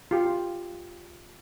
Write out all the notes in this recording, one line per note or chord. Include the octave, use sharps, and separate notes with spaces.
F4 G4